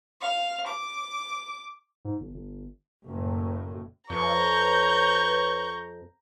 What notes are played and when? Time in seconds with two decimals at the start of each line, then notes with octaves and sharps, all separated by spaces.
0.21 F5
0.67 D6
2.05 G#2
2.20 G1
2.34 G1
3.05 F#1 A2
4.10 F2 B4 C#5 A#5 C#6 G6